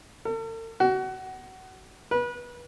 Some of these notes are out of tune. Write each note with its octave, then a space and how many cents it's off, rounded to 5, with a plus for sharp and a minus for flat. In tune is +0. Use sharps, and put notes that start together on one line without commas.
A4 +45
F#4 +25
B4 -30